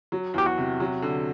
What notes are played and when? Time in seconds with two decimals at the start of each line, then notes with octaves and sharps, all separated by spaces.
0.12 F#3
0.34 E2 G4
0.46 F#4
0.58 C3
0.80 F#3
1.02 D3